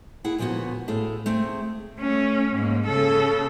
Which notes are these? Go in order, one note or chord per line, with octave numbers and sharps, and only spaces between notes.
A#3 E4 G#4 F#5
A#2 D3 F3 B3 F#4
A2 G#4 A4 F5
A3 C4 G#4
A3 C#4
G#2 A#3
C#3 A4